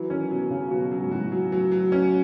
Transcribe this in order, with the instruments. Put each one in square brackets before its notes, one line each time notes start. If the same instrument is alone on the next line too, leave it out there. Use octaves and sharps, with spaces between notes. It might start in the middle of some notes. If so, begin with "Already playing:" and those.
Already playing: [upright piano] E3 [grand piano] F#3
[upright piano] D#3 [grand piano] C#4
[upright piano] B2 [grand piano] F#3
[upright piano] C#3 [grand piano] F#3
[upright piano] B2 [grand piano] F#4
[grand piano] F#3
[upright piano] G#2
[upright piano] A2 [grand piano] F#4
[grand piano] F#3
F#3
F#3
C#4